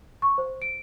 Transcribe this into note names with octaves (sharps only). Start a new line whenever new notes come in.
C#6
C5
D7